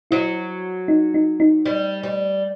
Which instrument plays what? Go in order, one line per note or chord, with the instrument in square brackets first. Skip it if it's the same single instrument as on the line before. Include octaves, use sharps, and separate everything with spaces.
[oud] F#3 [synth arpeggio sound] E4
[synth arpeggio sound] D#4
D#4
D#4
[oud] G3
G3